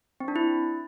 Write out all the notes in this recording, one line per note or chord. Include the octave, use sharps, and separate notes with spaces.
C4
D4
E4